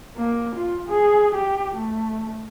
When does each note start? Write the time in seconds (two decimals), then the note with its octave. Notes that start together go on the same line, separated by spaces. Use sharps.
0.17 A#3
0.55 F4
0.89 G#4
1.35 G4
1.76 A3